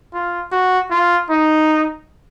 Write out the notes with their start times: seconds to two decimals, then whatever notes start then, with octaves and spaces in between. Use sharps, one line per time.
0.14 F4
0.52 F#4
0.91 F4
1.30 D#4